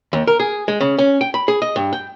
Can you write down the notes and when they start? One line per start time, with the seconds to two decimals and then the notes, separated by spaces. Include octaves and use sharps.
0.13 D#2
0.27 A#4
0.40 G#4
0.68 G#3
0.81 C#3
0.99 C#4
1.21 G5
1.34 B5
1.48 G#4
1.62 D#5
1.76 G2
1.93 G5